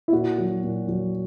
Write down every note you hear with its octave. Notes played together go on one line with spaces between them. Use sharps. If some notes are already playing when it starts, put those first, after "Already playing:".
E4
A#2 F#4
F#3
A#2
F#3